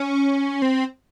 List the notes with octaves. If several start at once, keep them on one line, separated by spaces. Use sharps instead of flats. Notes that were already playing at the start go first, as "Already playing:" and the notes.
Already playing: C#4
C4